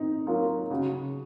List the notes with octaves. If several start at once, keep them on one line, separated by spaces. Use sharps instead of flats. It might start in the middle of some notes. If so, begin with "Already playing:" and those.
Already playing: C4 D#4
F#3 A#3 F4
C#3 F#4